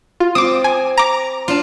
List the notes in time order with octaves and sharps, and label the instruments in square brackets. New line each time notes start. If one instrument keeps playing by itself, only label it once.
[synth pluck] F4
[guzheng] C4 [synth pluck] D6 D#6
[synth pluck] G#5
A#5 D6
[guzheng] D4 F4